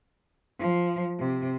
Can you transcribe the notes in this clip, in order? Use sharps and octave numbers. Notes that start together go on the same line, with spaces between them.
F3
C3